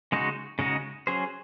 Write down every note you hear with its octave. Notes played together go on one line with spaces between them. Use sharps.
C#3 G#3 D#4 F#4
C#3 G#3 D#4 F#4
F#3 C#4 G#4 C5